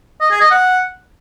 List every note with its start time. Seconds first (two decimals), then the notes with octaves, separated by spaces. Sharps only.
0.21 D#5
0.31 G#4
0.41 D#5
0.51 F#5